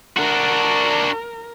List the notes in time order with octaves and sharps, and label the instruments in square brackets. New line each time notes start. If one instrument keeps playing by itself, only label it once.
[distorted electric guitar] D4 F#4 [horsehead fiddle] A#4